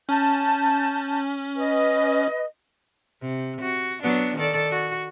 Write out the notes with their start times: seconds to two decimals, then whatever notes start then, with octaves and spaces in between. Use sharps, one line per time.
0.09 C#4 A5 G6
1.57 B4 D#5
3.21 C3
3.61 F#4
4.03 F#3 B3 D4
4.36 D#3 A4 D5
4.71 F#4